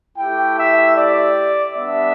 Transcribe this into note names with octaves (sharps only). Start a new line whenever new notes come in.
A3 E4 G4 G5
E5
D5
G3 B3 D4 E5